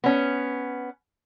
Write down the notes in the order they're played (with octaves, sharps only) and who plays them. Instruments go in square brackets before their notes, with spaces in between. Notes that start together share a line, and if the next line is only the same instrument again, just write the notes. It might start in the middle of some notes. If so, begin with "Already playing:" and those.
[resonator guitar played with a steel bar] B3 C#4